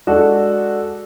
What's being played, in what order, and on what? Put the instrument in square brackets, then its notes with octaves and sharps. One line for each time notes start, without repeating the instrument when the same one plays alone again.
[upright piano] G#3 D4 F#4 A4